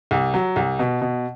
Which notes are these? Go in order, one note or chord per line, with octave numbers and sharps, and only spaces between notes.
C2
F#3
C2
B2
B2